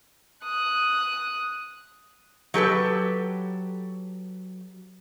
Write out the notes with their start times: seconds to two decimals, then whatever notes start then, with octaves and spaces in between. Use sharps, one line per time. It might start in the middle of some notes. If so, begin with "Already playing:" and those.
0.44 D#6 F#6
2.54 F#3 G4 A4 B4